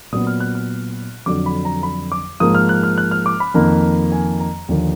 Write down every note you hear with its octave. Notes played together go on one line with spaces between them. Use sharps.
A#2 F#3 B3 D#6
F6
F#6
F6
F2 D3 F#3 D6
B5
A#5
B5
D6
G#2 F3 A#3 D#6
F6
F#6
F6
F#6
F6
D6
B5
F2 D#3 A#3
G#5
A#5
D#2 D3 F3 A#3